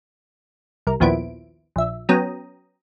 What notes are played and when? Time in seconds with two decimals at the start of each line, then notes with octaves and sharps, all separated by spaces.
0.87 C2 A#4
1.00 A#1 D#2 F3 B3 E4 D7
1.76 A#1 E5
2.09 F#3 B3 C#4 G5 A#5 D#6